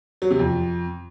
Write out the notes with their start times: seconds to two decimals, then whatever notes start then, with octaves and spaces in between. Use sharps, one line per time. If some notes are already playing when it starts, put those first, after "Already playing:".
0.22 F#3
0.30 C3
0.39 F2